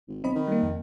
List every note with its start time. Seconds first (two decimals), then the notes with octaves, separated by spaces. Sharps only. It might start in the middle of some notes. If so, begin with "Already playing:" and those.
0.08 G#1
0.24 B1 C4 D#5 B5
0.35 D#3
0.47 G3 A#3
0.63 F2